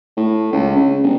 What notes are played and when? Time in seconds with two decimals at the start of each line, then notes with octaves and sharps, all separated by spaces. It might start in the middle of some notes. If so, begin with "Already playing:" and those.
0.17 A2
0.52 C#2
0.76 C#3
1.03 G1